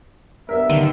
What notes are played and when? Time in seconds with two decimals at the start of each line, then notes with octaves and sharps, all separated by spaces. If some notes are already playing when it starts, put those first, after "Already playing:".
0.49 G2 B3 A#4 E5
0.69 D3 D#3 D#7 G7